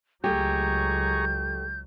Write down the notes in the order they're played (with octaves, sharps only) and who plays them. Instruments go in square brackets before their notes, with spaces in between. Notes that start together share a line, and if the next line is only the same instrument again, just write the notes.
[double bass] C#2 F#3 [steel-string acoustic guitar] A3 G4 [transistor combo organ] G#4 A#5 C#6 [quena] G6